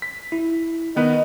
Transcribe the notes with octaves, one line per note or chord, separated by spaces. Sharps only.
B6
E4
D#3 B3 B4 D#5